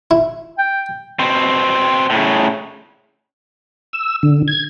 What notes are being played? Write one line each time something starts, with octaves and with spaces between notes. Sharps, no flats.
E4
G5
B2 C4
A2 C#3
E6
D3
G#6